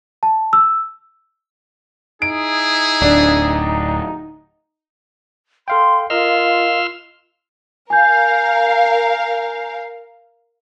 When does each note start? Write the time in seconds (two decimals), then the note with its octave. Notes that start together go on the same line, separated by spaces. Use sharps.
0.23 A5
0.53 E6
2.22 D#4 E4 G#4 D7
3.02 D1 D4
5.68 A4 F5 G5 C6
6.10 F4 A#4 D#5 F5 C6 E6 F6
7.90 A#4 F5 G#5 G6